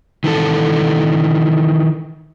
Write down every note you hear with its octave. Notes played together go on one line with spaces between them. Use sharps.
D#3 E3 A4